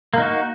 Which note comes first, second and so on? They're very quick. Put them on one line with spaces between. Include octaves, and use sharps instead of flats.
A#3 D#4 F#4